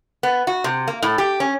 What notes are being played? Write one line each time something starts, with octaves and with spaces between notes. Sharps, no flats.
B3
F#4
C3
A#3
A2
G4
C#4